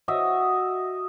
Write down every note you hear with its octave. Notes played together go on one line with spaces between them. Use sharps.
F#4 D#5 E5